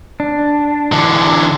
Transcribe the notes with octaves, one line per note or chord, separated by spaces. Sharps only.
D4
D3 E3